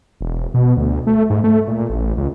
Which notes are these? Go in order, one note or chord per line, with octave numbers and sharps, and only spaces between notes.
E1
B2
D2
A3
G#2
A3
A#2
A1
C#2